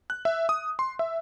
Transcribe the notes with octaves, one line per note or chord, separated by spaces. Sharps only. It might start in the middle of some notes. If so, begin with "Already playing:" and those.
F#6
E5
D#6
C6
E5